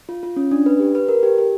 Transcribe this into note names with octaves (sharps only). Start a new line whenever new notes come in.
F4
F4
C#4
D4
B4
G4
B4
A#4
G4
G4